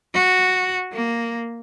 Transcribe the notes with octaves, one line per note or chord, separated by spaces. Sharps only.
F#4
A#3